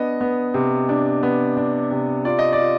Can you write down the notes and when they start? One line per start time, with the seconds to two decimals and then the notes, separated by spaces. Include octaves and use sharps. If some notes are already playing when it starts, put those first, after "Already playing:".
Already playing: B3 D4 D#5
0.21 B3
0.54 C3
0.89 D4
1.23 B3
1.57 D4
1.91 C3
2.25 F4 D5
2.39 D#5
2.53 D5
2.59 F4